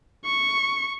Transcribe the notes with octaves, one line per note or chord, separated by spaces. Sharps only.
C#6